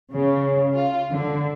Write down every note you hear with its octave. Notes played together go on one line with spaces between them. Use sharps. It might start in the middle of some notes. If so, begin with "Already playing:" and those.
C#3
F4
D3